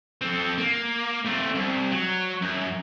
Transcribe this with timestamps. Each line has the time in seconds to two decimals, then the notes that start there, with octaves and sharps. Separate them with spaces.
0.22 C4 A4
0.58 A#3
1.26 A3 C4
1.55 C2
1.91 F#3
2.42 F#2